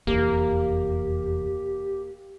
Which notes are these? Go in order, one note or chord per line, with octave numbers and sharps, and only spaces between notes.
F1 E2 A#3 G4